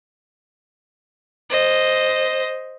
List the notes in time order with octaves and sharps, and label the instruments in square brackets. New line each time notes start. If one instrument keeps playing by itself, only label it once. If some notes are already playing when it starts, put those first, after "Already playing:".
[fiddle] C5 D#5